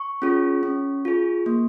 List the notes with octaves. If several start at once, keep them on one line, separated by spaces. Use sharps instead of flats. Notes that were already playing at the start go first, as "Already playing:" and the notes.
Already playing: C#6
C#4 F4 G#4
C#4
F4 G#4
A#3